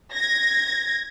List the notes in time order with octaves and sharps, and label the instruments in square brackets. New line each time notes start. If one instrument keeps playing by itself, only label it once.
[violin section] G#6 A#6